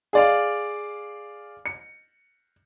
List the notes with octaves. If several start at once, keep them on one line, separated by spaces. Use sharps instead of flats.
G#4 D5 F5
C#7